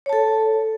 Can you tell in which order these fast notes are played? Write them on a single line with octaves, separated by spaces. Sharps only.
C#5 A5 A4